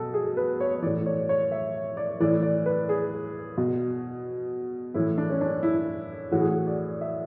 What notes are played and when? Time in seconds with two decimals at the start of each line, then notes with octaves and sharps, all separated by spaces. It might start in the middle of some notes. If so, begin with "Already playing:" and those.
Already playing: B2 A4
0.14 G#4
0.37 B4
0.60 C#5
0.75 C#5
0.82 A2 E3 D5
1.06 C#5
1.29 C#5
1.52 E5
1.97 D5
2.20 A2 E3 D5
2.43 D5
2.66 B4
2.89 G#4
3.58 B2
4.94 A2 E3 E4
5.18 D4
5.30 C#4
5.41 D4
5.63 E4
6.32 A2 E3 F#4
6.41 G#4
6.49 F#4
6.67 D5
7.01 E5